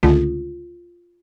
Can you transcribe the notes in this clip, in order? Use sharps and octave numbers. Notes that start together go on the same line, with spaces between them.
C#2 D3 A3 F4